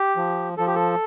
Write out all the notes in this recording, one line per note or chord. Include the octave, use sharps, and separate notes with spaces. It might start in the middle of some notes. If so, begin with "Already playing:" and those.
Already playing: G4
F3
F3 A4
G4
A4